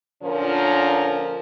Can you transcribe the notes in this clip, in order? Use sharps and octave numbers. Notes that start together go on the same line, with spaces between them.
A#2 D3 F3 C#4 A#4